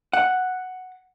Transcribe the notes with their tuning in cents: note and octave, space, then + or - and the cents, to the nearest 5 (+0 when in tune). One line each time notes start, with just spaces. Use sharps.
F#5 +0